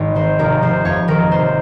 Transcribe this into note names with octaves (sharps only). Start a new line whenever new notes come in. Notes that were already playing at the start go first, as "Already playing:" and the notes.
Already playing: G#1
D#3 C5
F1 A#4
F1 C5
F2 C#5
D#3 A#4
F1 C5